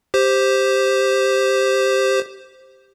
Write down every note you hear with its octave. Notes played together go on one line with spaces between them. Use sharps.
G4 C5